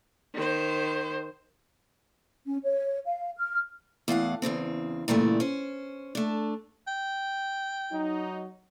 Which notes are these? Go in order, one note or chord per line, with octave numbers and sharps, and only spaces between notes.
D#3 C5
C#4
C#5
F5
F6
E2 A2 F5 F#5
E2 A#2 C#3 C4
A#2 C#3 E3 F3 G3 A3
C#4 C5
A3 D4
G5
F#3 D#4